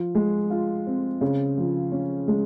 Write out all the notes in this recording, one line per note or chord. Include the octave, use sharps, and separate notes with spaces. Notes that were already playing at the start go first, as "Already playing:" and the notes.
Already playing: F3
G#3
F4
C4
C#3
F3
C#4
G#3